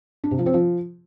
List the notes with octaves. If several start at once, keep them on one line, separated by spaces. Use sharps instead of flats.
D4
C3
F3
C4
F3